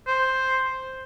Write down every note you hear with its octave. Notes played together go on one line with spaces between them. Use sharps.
C5